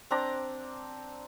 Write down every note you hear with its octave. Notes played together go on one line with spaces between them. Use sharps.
C4 D4 A#5 D6